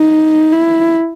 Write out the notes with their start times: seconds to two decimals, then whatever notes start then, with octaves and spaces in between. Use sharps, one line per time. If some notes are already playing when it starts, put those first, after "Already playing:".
Already playing: D#4
0.52 E4